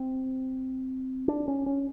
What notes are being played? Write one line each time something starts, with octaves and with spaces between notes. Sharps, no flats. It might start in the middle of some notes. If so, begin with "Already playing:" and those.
Already playing: C4
D4
C#4
C#4